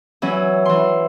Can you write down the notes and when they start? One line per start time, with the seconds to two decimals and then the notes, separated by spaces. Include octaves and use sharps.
0.22 E3 F#3 C#4
0.65 E3 C6